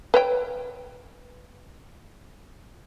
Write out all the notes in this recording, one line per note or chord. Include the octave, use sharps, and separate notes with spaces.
B4 C#5 G5